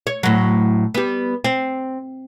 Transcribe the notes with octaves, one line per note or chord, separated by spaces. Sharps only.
C#5
A2 F#3
G3 B3
C4